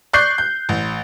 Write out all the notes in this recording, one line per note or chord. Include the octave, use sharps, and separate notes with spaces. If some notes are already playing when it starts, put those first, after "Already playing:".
D5 C#6 F#6 G6 C7
G6
A1